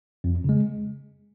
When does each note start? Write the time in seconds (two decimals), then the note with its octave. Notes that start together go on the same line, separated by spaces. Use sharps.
0.24 F2
0.44 C#3 G#3